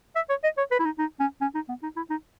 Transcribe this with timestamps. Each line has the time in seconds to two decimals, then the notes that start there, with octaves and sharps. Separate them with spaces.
0.16 E5
0.29 C#5
0.44 D#5
0.58 C#5
0.71 B4
0.79 E4
0.85 D#4
0.99 D#4
1.20 C#4
1.41 C#4
1.55 D#4
1.69 B3
1.83 D#4
1.96 E4
2.10 D#4